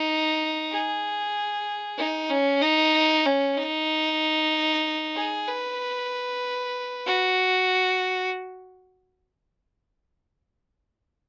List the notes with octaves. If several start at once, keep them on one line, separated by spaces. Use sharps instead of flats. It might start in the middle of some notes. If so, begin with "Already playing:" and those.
Already playing: D#4
G#4
D#4
C#4
D#4
C#4
D#4
G#4
B4
F#4